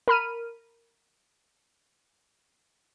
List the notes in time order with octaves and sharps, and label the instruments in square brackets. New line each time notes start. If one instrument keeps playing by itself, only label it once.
[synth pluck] A#4 B5 F6 D#7